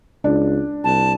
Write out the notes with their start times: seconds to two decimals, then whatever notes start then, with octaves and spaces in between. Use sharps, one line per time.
0.24 C#2 D4
0.84 C2 A5